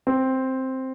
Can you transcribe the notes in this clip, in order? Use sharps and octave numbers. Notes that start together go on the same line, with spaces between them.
C4